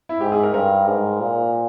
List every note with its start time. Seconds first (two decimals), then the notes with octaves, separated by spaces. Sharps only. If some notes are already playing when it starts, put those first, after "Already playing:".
0.09 E4
0.20 G#2 G4
0.32 G#4
0.43 A#4
0.54 G2 A#4
0.87 G#2
1.20 A#2